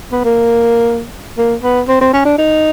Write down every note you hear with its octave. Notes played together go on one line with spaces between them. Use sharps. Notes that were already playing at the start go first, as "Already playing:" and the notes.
B3
A#3
A#3
B3
C4
C4
C#4
D4
D#4